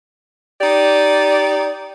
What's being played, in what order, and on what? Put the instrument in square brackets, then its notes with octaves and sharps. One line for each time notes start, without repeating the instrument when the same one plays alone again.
[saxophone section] D#4 G4 D5